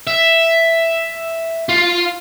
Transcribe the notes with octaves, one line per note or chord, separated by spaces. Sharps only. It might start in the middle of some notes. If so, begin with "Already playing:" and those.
E5
F4